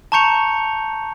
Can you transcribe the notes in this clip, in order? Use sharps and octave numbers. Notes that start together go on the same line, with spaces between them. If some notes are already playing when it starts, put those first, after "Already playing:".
A5 A#5 C#6 G6 C#7 F7